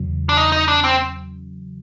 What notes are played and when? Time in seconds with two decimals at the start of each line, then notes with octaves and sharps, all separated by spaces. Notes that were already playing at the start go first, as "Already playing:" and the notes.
Already playing: E2 C#3 F#3
0.29 D4
0.37 D#4
0.52 D#4
0.68 D4
0.84 C4